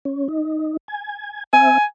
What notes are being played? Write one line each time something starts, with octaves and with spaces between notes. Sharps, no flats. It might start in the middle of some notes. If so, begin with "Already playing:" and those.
C#4
D#4
G#5
C4 E5 G#5